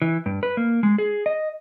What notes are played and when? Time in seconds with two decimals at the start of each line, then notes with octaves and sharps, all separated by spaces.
0.02 E3
0.26 G2
0.43 B4
0.57 A#3
0.83 G#3
0.98 G#4
1.26 D#5